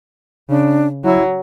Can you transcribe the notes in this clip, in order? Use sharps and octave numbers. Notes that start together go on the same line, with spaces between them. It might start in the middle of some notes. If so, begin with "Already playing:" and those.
C#3 D4
F#3 E4